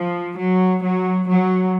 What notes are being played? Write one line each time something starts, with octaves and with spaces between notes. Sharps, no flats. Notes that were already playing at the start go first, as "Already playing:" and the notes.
Already playing: F3
F#3
F#3
F#3